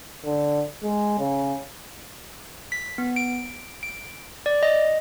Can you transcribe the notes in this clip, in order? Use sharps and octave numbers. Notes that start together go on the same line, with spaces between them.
D3
G#3
C#3
B6
B3
D7
D7
D5
D#5